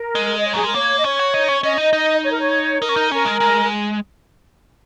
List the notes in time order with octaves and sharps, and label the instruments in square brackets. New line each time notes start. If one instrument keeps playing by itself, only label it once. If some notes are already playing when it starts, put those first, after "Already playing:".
Already playing: [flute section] A#4
[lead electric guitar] G#3
[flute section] D#5
C#5
[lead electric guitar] F#3 [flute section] G#4
[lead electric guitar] G#3 [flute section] A#4
[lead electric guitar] A#3 [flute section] C#5
[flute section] D#5
[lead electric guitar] C#4 [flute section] C#5
[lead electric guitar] F#4
D#4
C#4
[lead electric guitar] C#4 [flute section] D#5
[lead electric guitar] D#4
D#4
[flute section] C#5
A#4
C#5
[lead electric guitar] D#4 [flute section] A#4
[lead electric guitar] C#4
D#4
[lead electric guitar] C#4 [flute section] A#4
[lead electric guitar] G#3
G#3